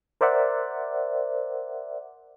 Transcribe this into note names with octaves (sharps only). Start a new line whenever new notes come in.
A#4 C5 D5 E5 F#5